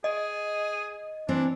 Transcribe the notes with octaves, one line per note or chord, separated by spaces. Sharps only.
G#4 D#5
E3 C4 D4